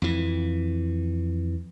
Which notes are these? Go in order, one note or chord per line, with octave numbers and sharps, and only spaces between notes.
F2 E3